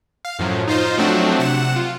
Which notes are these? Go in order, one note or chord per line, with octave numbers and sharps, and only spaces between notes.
F5
F#2 A2 F3 F#3
D#4 F4 C5
F3 F#3 A3 C4 D4 F#4
C3 F#5 E7
F4